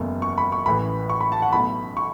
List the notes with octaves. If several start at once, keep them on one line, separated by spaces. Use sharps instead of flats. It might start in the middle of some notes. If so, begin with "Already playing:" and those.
Already playing: F#1 E2 C#3 A3
C#6
B5
C#6
A1 A2 E3 B5
C#6
B5
A5
F#5
B1 A2 A3 B5
C#6